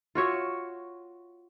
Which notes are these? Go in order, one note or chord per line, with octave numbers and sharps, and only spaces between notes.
F4 F#4 C#5 E5